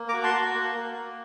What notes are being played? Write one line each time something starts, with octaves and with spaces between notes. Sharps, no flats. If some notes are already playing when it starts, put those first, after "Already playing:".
Already playing: A#3
F#4 A#5 D6
A5 C6
F#4
A#3
A#3
A#3